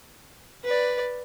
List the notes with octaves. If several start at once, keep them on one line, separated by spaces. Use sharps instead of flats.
B4 D5